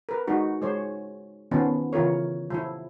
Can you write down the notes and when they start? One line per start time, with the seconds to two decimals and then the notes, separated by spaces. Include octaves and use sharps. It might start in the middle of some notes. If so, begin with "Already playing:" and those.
0.09 A#4 B4
0.27 G#3 D#4 F#4
0.62 G#3 C5 C#5
1.51 D#3 F3 B3 C#4
1.93 C#3 E3 F4 A#4 C#5
2.50 F3 E4